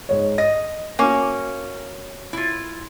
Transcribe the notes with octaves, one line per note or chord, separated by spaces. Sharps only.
G#2 C#5
D#5 A#6
A#3 C#4 F#4 A#4
E4 F4